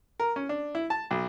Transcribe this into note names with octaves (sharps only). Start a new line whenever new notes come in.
A#4
C#4
D4
E4
A5
B1